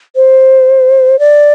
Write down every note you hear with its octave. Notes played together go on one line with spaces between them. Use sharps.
C5
D5